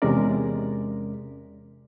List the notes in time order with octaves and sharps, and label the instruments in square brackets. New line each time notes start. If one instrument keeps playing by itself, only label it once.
[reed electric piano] E2 C3 G#3 C#4 A#4 D5